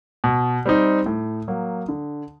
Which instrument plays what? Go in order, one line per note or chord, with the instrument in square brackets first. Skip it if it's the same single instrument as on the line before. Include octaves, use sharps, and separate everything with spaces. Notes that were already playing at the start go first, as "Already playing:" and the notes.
[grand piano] B2
G3 C4 D#4
A2
F#3 A#3
D3